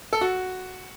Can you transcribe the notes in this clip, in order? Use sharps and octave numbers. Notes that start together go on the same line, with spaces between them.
A4
F#4